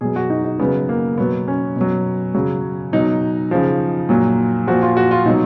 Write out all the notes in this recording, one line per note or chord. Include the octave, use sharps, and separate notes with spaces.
B2 F#3 G#4
F#4
D#4
D#4
C#3 F#3 B3
A#3
B2 F#3 B3
C#4
B2 F#3
C#3 F#3
B2 F#3 D#4
C#3 F3
A#2 F#3
A#2 F3 F#4
F4
F#4
F4
B2 F#3 D#4